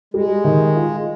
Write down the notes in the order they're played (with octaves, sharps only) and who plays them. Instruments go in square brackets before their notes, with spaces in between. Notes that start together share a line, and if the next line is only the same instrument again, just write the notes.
[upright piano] G3 [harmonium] G#3
[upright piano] D#3
F4